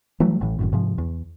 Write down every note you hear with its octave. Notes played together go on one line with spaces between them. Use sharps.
E3 F#3 G3 A3
A1 A2 E3
G#1 F#2 A2
G#2 C3 F3
E2